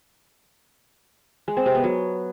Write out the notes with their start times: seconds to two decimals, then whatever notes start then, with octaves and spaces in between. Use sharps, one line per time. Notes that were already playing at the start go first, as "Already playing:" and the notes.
1.48 G#3
1.57 C4
1.66 C3
1.75 B3
1.84 F#3